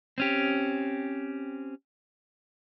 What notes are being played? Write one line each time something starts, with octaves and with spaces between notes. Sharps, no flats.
C4 C#4 G4